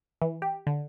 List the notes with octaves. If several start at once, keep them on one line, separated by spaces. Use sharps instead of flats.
E3
G4
D3